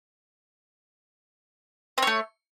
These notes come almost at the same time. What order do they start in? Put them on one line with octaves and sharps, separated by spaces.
C4 C#5 A3